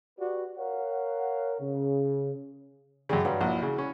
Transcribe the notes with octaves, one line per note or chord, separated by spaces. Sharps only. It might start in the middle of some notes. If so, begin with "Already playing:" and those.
F#4 G4 B4 D5
A#4 C#5 F5 F#5
C#3
F#2 C#3 G4 D5
G2 F#3 F5 D#6
A#1 E4 F#4
C#3
C#4